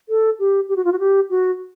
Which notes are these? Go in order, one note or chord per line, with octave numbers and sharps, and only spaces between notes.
A4
G4
G4
F#4
F4
F#4
G4
F#4